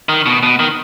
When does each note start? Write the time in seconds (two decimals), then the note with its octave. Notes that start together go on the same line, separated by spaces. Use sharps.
0.09 D#3
0.26 B2
0.43 B2
0.60 D#3